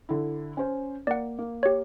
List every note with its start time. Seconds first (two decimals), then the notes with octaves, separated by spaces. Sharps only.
0.09 D3 E4
0.57 C#4 C5
1.07 A#3 D5 F#5
1.39 A#3
1.63 G4 C#5